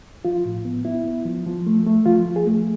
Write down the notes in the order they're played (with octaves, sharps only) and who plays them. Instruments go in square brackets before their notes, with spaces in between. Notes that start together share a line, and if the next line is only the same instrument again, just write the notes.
[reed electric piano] F3 F4
A2
B3
B3 E4
B3
F3
F3
A3
A3
F3 F4
F3
G#4
A3